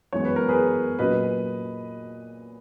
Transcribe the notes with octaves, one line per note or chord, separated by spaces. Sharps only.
F#2 E3 G#3 B3 C#5
B4
A#4
G#4 B4
A#2 F#3 C#4 B4 D#5